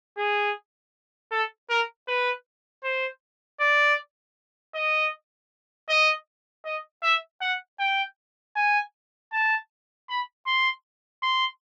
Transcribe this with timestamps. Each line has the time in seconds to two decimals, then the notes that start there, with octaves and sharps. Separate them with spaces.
0.18 G#4
1.32 A4
1.70 A#4
2.08 B4
2.84 C5
3.60 D5
4.75 D#5
5.89 D#5
6.65 D#5
7.03 E5
7.42 F#5
7.80 G5
8.56 G#5
9.33 A5
10.09 B5
10.47 C6
11.23 C6